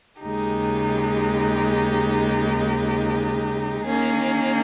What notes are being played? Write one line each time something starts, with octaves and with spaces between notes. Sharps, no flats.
D#2 C#3 G#3 D#4 G4
D#3 A#3 C#4 G#4